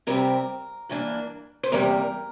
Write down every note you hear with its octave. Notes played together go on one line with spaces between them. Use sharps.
C3 G3 C4 A#4
G2 E3 A#3 D4
C5
E2 C3 G3 A#3 A#4